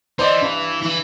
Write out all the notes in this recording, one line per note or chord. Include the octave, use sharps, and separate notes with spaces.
E3 C5 D5 D#5
G2
E3 E4